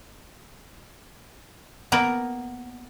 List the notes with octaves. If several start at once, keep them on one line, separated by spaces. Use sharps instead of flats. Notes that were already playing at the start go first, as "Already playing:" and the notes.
A#3 B3 A#4